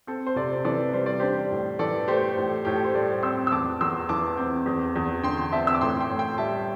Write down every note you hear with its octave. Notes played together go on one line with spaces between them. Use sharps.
C4 A4
C5
C3 A4 D5
E3 A4 D5
G3 C5
D5
D4 G4 C5
A2
E3 A4 D5
A3 G4 C5
A2
A2 G4
A4
C5
G3 A4 D5
C4 C6 E6
E6
E2 A5 D6
E2 C6 E6
E3 A5 D6
C4
E2
E2
D3 G5 C6
C4 E5 A5
E6
D6
A2 G5 C6
G5 C6
A2
G5 C6
G3 E5 A5